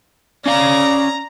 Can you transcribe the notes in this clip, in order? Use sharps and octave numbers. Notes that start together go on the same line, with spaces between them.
C#4 D5 F5 A#5